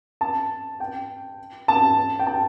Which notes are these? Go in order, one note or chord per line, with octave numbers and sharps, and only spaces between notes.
A5
G5
A5
G5
A5